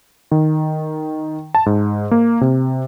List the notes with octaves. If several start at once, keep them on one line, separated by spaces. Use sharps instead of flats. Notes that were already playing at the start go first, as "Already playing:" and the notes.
D#3
A5
G#2
A#3
C3